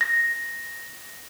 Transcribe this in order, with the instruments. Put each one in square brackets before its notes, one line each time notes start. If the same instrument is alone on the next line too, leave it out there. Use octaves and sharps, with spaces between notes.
[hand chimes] A#6